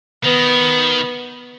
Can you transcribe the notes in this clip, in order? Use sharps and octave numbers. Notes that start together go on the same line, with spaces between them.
D#3 B3